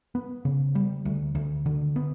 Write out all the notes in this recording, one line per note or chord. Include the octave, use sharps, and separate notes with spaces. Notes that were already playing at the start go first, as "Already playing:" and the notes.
B3
C#3
G3
D2
D2
D3
B3